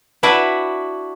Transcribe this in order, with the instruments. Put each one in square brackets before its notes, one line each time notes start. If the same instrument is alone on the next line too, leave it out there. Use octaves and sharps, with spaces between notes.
[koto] D4 E4 F#4 B4 D5